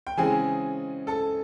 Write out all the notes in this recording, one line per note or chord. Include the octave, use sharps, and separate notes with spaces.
G5
C#3 E3 G#3 C4 G#4 G#5
A4 A5